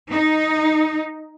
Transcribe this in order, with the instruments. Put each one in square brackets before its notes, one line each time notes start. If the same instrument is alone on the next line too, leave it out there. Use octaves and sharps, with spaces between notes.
[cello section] D#4